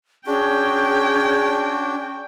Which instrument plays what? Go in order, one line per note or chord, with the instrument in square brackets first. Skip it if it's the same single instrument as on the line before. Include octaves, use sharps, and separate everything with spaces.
[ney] C#4 [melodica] D4 F#4 [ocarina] G#4 [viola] G5